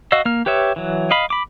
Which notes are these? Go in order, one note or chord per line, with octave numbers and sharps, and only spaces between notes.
F#4 D#5 F5 E6
A#3 F6
G4 B4 C#5 E5
E3 F#3
D#5 F5 B5
B5 D6